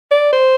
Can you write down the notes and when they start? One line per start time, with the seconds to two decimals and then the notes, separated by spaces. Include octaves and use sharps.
0.11 D5
0.32 C5